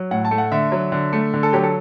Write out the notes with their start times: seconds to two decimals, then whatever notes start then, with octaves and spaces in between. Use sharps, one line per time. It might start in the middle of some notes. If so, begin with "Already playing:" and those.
Already playing: F#3
0.11 A2 F#5
0.25 A5
0.31 A3
0.38 F#5
0.52 D3 E5
0.72 F#3
0.92 D3
1.13 A3
1.34 D3
1.43 A4
1.53 F#3 G4
1.63 A4